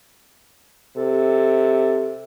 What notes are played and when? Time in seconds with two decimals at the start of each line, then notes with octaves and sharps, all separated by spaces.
0.97 C3 A4